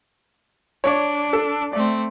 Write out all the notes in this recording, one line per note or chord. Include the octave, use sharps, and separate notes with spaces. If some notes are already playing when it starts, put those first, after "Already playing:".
D4 C#5 D5
A4
A3 C4 D5